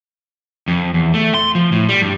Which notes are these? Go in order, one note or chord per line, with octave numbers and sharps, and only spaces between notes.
F2
E2
A3
C6
F3
A2
G3
G2